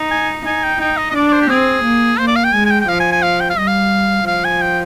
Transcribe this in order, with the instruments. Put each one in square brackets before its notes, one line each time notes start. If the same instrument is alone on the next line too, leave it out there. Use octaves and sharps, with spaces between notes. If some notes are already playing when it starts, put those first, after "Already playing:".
Already playing: [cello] D#4
[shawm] G#5
[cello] D#4 [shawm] G#5
[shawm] G5
[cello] D#4 [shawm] G5
[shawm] D#5
D#5
[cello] D4 [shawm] D5
[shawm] D5
C5
G4
[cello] C4 [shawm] G#4
[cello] A#3
[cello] A#3 [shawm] C5
[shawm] D5
F5
G5
[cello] G#3 [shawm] G#5
[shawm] G#5
G5
G5
[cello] F3 [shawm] F5
[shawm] G#5
G#5
F5
G5
F5
[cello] G3 [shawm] D#5
[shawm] F5
[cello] F3 [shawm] F5
[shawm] G#5
G5